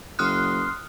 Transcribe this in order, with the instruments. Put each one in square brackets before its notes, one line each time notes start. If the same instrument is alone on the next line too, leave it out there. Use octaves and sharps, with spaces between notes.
[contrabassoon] F#1 [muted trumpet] C6 [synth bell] D#6 F6 F#6